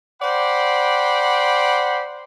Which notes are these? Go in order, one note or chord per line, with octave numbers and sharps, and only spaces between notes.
C5 D5 F#5 G5 B5 C6